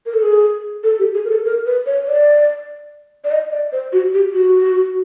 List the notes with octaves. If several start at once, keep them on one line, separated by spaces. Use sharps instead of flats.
A#4
A4
G#4
A4
G4
G#4
A#4
A4
A#4
B4
C#5
D5
D5
D#5
D5
C5
F#4
G4
F#4